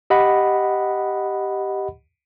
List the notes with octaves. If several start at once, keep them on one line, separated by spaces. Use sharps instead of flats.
G4 D#5 F#5 B5